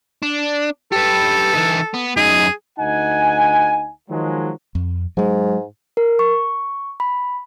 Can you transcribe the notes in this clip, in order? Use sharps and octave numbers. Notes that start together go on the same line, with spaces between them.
D4
G4 A4 B4
E3 D#4
B3
F#2 D#4 G#4
D2 D#4 F#5 G#5
D#3 F3 F#3 G#3
F2
G#2 F#3 G#3
A#4
C#6
B5